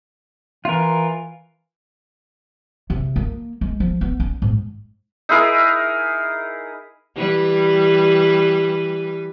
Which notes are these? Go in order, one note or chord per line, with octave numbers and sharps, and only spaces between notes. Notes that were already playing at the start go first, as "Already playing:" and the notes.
E3 F4 A#4
C3
A#3
G#3
F3
B3
C#4
G#2
D#4 E4 G#4 A#4
E3 G3 B4